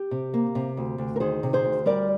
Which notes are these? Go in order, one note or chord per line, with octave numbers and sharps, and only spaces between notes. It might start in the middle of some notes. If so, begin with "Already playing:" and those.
Already playing: G4
C3
A#3
C3
D2
D2
A#4
D#3 G#4 C5
C3
G#4 C5
D2
G3 A#4 D5